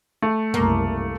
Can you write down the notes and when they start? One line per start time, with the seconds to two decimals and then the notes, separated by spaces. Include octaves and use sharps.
0.22 A3
0.54 F#1 C2 A#3